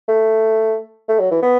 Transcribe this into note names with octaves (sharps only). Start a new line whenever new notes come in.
A3
A3
F#3
E3
B3